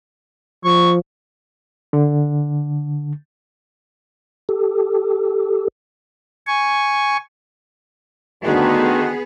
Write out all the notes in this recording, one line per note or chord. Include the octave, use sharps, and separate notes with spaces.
F3 C#6
D3
G4 A4
G#5 C#6
D2 D3 D#3 B3 F#4 G#4